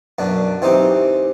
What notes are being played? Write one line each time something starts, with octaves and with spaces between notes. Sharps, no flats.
F#2 B2 D4
E3 C4 D#4 G4